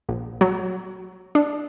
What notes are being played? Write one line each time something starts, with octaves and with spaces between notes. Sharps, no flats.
A#1
F#3
D4